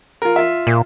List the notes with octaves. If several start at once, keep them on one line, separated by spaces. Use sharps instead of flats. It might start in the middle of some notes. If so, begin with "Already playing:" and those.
F4 A#4
F4 E5
A#2